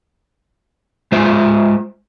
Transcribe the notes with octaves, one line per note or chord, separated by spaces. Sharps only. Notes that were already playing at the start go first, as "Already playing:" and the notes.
G#3 F4 C5 E5